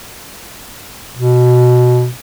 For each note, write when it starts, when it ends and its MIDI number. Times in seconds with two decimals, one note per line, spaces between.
1.15 2.09 47